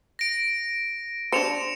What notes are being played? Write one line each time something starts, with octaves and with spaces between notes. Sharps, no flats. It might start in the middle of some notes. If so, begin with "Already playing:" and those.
A#6 D7
D4 C5 C#7 E7 F7